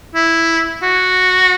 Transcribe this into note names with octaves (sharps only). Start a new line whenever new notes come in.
E4
F#4